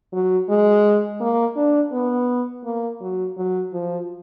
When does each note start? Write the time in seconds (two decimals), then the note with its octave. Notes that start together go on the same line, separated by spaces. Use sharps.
0.13 F#3
0.49 G#3
1.20 A#3
1.56 D4
1.92 B3
2.64 A#3
3.01 F#3
3.37 F#3
3.73 F3